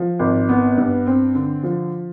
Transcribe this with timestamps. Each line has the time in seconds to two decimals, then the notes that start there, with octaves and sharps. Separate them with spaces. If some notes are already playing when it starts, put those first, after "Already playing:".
Already playing: F3
0.19 G#1
0.49 B3
0.78 G2
1.07 C4
1.35 D3
1.63 F3